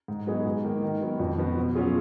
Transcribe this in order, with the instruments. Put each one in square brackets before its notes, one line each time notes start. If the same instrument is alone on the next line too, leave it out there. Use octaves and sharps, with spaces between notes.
[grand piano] G#2
F#3 B3 D#4 G#4
G#2
D#3 A#3
D#3
F#3 B3
F2
F3 B3 F#4
B2
F#3 C#4 F4 G#4